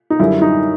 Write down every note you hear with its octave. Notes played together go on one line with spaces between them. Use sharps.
D#4
F#2 D3 G3 E4
D#4